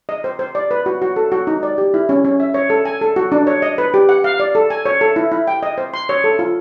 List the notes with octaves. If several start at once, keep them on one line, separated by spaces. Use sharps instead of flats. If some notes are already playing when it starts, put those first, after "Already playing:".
D#5
C5
C5
D5
B4
F#4
F#4
A4
F#4
D#4
D5
G4
E4
C#4
C#4
E5
C#5
A4
G#5
A4
F#4
D4
C#5
D#5
B4
G4
F#5
F5
D5
A4
G#5
C#5
A4
E4
E4
G5
D#5
C5
C6
C#5
A4
F4